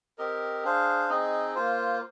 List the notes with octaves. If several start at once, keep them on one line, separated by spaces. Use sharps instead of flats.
C4 G4 A#4 D#5
D4 G#4 C5 F5
C4 D#4 G#4 D#5
A#3 F4 C5